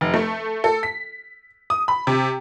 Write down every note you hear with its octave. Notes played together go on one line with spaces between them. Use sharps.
F1
A3
A4
B6
D#6
B5
C3